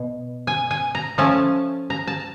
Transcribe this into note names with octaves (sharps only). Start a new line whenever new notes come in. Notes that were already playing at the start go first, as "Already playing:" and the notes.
Already playing: B2
G#5
G#5
A#5
F3 A3 C#4 A5
A#5
A5